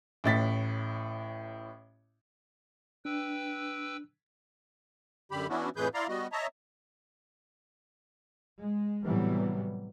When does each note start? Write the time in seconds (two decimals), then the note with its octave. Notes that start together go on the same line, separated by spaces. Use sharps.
0.24 A1 A2 A6 B6
3.05 D4 B4 G5 E6
5.31 F#2 D3 G3 G4 B5
5.50 E3 B3 C#4 D4 E4 F#4
5.76 F2 A2 E3 G#4 B4 G6
5.94 E4 D5 F5 A#5 C6
6.09 G3 B3 F#4 D#5
6.32 C#5 D#5 E5 A5 A#5
8.60 G#3
9.03 A2 C3 E3 F#3 G3 B3